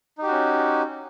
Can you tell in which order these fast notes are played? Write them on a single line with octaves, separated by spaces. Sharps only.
D#4 G4 F#4 C#4